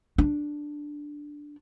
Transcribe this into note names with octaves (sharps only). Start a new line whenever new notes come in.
D4